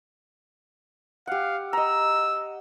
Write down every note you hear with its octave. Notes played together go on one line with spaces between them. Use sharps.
G4 F5 F#5
D#5 A#5 E6